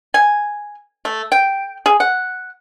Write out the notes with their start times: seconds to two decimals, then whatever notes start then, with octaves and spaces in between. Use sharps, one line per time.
0.14 G#5
1.05 A3
1.32 G5
1.86 G#4
2.00 F#5